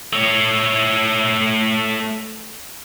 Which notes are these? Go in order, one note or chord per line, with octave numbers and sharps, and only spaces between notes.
A3 C#5